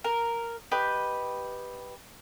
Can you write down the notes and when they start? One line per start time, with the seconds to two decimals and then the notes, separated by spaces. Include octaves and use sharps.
0.04 A#4
0.72 G4 B4 D#5